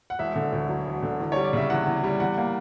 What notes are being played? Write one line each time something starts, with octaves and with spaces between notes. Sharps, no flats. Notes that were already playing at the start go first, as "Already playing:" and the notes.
F#5
E1 E5
D3
D2
F#3
E1
D3
E2
G3 C#5
D5
C#3 E5
E2 F#5
E2
G3
E2 F#5
A#3